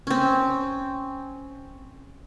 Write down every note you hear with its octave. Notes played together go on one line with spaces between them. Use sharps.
C4 C#4